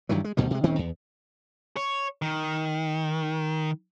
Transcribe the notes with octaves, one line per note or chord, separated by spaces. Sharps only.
G2 D#3 E3 F#3
G#3
D2 B2 D#3 G3
C3 G#3
D#1 D#3 C4 C#4
E2
C#5
D#3